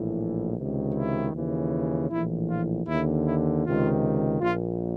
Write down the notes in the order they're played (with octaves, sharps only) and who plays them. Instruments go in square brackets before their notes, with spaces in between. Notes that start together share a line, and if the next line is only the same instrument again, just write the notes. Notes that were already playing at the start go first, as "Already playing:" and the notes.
Already playing: [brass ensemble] A#1 A2 E3
C#2 C3 D#3
E4
D#2 C#3 E3
A#1 A2 E3 E4
F4
D#2 D3 E4
E4
C#2 C3 D#3 F4
A#1 A#2 F4